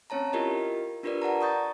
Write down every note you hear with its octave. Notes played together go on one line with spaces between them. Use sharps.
C4 C#4 C#5 A5 A#5
E4 F4 G4 A#4 D#5
D4 F4 G4 A#4 B4 D5
D5 F#5 A5 A#5
C#6 D#6 G6 A6